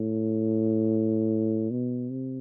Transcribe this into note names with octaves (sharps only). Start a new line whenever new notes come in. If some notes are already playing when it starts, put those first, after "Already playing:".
Already playing: A2
B2
C3